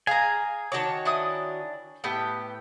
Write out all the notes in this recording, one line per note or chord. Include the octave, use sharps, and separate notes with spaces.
G#4 F5 G#5 A#5
D#3 F#4 C#5 A5 D6
D4 E4 D#6
A2 B3 G4 G5